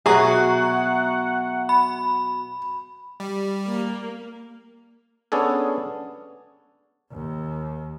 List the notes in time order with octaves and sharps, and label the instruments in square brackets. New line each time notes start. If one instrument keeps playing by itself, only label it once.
[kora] B2 F#3 [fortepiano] G#4 [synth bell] E5 A#5 C#6 [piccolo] F#5
[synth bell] B5
[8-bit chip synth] G3
[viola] A#3
[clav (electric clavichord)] B3 C#4 D4 G#4 A4
[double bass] D#2